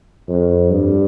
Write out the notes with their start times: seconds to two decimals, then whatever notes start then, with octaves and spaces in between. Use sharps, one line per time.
0.29 F2
0.71 G2